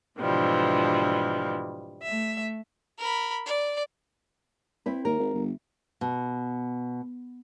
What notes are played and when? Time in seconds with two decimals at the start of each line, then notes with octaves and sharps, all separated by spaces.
0.19 G#2 B2 D3 E3 F3 G3
2.03 A3 E5
2.99 A#4 B5
3.46 D5
4.86 C4 E4 B4
5.05 D#2 A#4
5.19 G#1
5.34 G1
6.01 B2